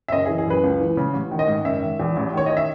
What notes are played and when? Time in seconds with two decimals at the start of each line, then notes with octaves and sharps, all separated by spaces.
0.08 E5
0.12 F#1 D#5
0.25 E3 G#4
0.38 G#4
0.46 F#2 B4
0.64 C#2
0.80 E3
0.97 C#3
1.13 A1
1.31 D#3
1.39 D#5
1.48 G#2
1.65 F#1 E5
1.82 D#3
2.00 E2
2.17 A1
2.33 D#3 C#5
2.46 D#5
2.57 E5